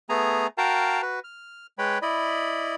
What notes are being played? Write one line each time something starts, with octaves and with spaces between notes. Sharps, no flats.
A3 B3 G#4 G#5 A#5
F#4 A#4 F5 G5 A5 A#5
F#4 B4
F6
G#3 B4 C#5 G5 B5
E4 D5 D#5 B5